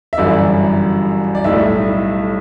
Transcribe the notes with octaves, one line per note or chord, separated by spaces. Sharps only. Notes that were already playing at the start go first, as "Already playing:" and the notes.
E5
G1 F#2 E3 G3 D5
D5
B1 A2 G3 E5